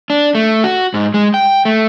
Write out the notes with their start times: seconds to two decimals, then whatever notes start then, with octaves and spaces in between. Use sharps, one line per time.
0.10 D4
0.35 A3
0.64 F#4
0.94 G#2
1.14 G#3
1.34 G5
1.65 A3